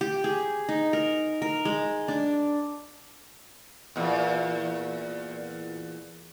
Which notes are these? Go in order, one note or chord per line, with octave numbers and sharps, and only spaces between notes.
G4
G#4
D#4
A#4
A#4
G#3
D4
E2 A#2